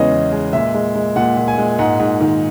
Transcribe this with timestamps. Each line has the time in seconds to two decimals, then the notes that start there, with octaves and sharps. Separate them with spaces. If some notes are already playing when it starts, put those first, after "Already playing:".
Already playing: E2 C#3 E3 G#3 C#5 D#5
0.11 E2
0.32 G#3
0.53 A#2 E5
0.74 G#3
0.95 G#3
1.16 A#2 F#5
1.37 A#2
1.48 G#5
1.58 G#3
1.79 G#2 F#5
2.00 G#2
2.21 D#3